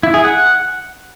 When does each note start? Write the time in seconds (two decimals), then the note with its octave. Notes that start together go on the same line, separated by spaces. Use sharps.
0.03 E4
0.14 G#4
0.24 F#5